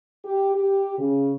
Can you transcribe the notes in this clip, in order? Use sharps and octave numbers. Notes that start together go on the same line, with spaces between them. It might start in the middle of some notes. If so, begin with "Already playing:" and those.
G4
G4
C#3